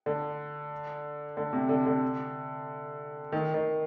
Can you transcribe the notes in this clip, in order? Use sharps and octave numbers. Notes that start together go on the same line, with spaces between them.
D3
D3
C3
D3
D3
D#3
D#3